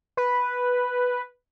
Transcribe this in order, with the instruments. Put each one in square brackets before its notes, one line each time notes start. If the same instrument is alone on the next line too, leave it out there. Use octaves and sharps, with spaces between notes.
[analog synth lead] B4